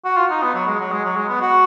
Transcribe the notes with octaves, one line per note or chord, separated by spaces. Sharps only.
F#4
F4
D#4
B3
F#3
G#3
F#3
G#3
F#3
G#3
B3
F#4